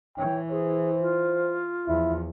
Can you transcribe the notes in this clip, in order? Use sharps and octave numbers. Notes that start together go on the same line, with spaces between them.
E3 C#5 G5
G#4 C5
F4
E2 F3 E4